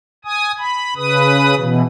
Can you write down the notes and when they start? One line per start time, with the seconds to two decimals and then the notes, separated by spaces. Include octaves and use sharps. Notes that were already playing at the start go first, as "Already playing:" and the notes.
0.25 G#5 D#6
0.59 B5
0.96 C#3 B4 D#6
1.57 B2 E3